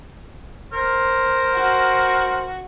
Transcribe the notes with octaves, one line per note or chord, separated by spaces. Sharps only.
A#4 C5
F#4